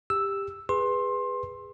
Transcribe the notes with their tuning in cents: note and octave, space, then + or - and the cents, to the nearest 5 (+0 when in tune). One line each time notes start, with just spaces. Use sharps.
G4 +20 E6 +0
G#4 -20 B4 +0 C6 +20